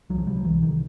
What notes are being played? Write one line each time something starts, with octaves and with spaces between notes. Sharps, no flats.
C2 F#3
F3
C3 G3
F#3
C2 E3
C3 D#3